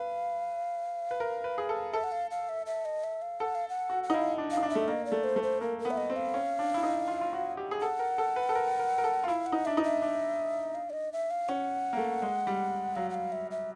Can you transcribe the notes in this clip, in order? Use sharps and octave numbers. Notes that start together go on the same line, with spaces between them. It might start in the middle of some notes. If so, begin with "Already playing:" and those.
Already playing: B4 F5
B4
A#4
B4
G#4
A4
A4 E5
F#5
F5
F5
E5
E5
D#5
E5
F5
A4 F#5
F5
F#5
F#4
F#5
D#4
E4 F5
D4
F5
D#4
D4
E5
A3
A#3 D#5
D5
A3
C5
A3
C5
A#3 A#4
A#4
B3
E5
D#5
C4
F5
C#4
D4
E4
D#4
F4
F4
F#4
G4
G#4
A4 F#5
A#4
A4
B4
A4
A#4
A#4
A#4
A4
F4
E4 F5
F#5
D#4
D4 E5
D#4
E5
D4
F5
D5
D#5
E5
F5
C#4 F#5
A#3
A3
G#3
G3
F#3 F5
F#5
F5
E5
E5